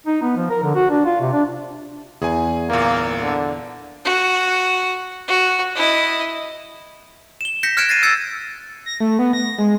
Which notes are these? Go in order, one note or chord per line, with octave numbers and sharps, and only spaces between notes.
D#4
B3
F3
A#4
D3
F#4
D4
F4
C3
D4
E2 G#4 G#5
G1 A#2 A#3
D3
F#4
F#4
E4 D#5
E7 G7
G6 A#6 B6 C#7
F6 F#6 G#6 C#7 D7 E7
A6 A#6 C7 D#7
E6 G#6 A6 C#7
A#6
A3
B3
A#6
G#3